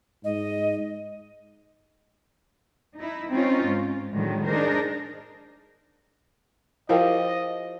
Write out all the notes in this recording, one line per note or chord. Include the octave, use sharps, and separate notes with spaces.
G#2 D#5
D#4 E4
C4 C#4 D#4 F4 C5
G#2
A2 D3 D#3 F#3 G#3
D4 D#4 G#4 A#4 C5
F3 E4 G4 A#4 D#5 G5